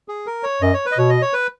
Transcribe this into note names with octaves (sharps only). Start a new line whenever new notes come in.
G#4
A#4
C#5
F#2 D#5
C#5
B4
D#5
B2 C#5
D#5
C#5
B4